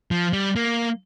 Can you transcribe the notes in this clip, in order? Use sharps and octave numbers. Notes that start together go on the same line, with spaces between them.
F3
G3
A#3